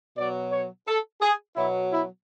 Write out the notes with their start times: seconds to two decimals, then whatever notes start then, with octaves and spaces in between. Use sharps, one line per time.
0.17 B2 F#3 D5
0.51 C#5
0.87 A4
1.21 G#4
1.56 B2 F#3 E4
1.91 E4